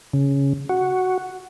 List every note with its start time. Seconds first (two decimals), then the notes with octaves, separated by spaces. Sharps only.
0.13 C#3
0.69 F#4